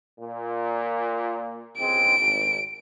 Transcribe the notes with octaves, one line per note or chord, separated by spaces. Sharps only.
A#2
C#2 G#3 C4 D7
G#1